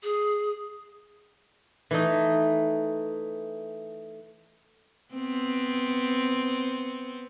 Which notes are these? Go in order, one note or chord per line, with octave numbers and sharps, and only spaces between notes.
G#4
E3 A3 D#4
B3 C4